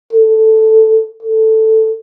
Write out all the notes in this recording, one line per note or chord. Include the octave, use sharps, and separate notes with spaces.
A4
A4